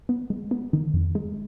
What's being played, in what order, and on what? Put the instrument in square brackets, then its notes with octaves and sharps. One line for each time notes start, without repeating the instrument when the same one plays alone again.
[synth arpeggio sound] B3
G#3
B3
D#3
F2
G#3